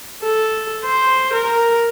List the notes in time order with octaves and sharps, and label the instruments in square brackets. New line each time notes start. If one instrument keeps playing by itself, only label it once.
[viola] A4
C5
A#4